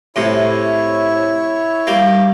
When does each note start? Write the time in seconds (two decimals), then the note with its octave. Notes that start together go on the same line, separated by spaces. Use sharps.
0.16 A2 C3 E4 C#5
1.87 G3 A#3